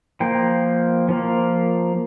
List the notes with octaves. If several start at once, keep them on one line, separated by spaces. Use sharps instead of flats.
F3 A#3 G5
F3 A#3